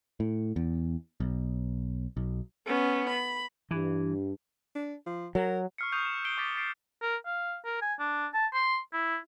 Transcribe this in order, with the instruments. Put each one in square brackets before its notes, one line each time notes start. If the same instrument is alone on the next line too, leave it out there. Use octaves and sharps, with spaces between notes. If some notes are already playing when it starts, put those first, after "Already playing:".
[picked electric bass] A2
E2
B1
B1
[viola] B3 C#4
B5
[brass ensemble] G2 [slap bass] E3
[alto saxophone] D4
F3
[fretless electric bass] F#3 [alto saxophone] A#4
[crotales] C#6 E6 F6 C7 C#7
C#6 D#6 G6 C7 D#7 F7
E7
C7 D7 G7
C#6 D6 A6 B6 D7 F7
C#6 A6 B6 C7 D7
[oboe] A#4
F5
A#4
G#5
D4
A5
C6
E4